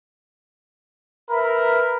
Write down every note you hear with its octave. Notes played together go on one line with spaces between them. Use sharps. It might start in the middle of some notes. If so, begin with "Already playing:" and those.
A#4 B4 E5 B5